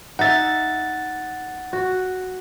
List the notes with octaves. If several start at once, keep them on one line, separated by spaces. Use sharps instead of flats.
D#4 E5 F#5 A6
F#4